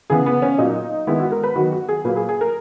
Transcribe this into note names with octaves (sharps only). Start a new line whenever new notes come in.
C#3 E3 B3 G#4
B3
C#4
A#2 F#3 A#3 D#4
D#3 G#3 B3 E4
F#4
A#4
B4
D#3 F#3 B3 F#4
F#4
G#4
A#2 F#3 A#3 B4
G#4
G#4
A#4